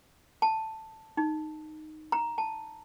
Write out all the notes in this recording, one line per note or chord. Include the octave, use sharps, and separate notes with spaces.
A5
D#4
A#5
A5